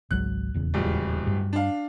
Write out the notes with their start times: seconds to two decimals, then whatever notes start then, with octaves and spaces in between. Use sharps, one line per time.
0.11 G#1 C#2 F#3 F#6
0.54 D#1 E2 C#3
0.74 D1 C#2 G3
1.27 G2
1.53 D4 F5